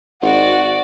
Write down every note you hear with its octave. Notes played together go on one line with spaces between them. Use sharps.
G#1 F#4 D5 F#5